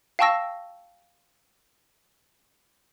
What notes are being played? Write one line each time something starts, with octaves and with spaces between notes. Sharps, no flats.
F5 G5 A5 C#6 E6 A#6